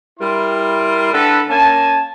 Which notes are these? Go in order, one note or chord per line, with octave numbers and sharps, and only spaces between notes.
G3 E4 A#4 C6
D3 A4 B4
A#3 C#4 G#5 A5